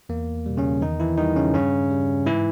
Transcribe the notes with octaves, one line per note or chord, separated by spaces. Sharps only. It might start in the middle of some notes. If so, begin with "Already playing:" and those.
E2 A#3
B2 G3
C#3 C#4
E2 D#3 D#4
E3 E4
D#3 G3 D#4
C#3 C#4
G2 C#3 C#4
G3
G#2 E3 E4